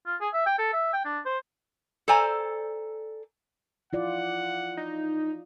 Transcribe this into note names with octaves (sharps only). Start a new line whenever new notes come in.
F4
G#4
E5
G5
A4
E5
G5
D4
C5
A4 C5 D5 G#5 A#5
E4 F4 D5 F#5
D#4